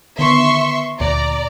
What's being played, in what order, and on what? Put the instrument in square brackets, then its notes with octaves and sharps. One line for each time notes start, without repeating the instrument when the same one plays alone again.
[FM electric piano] D3 D#3 B3 [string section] E5 C6 C#6
[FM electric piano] D2 A#2 [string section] D5 A#5